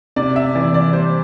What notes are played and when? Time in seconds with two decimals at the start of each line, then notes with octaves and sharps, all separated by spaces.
0.16 C3 D5
0.36 E5
0.55 E3 D5
0.74 D5
0.93 G3 C5